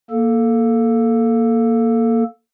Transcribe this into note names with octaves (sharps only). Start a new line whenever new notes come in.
A#3 A4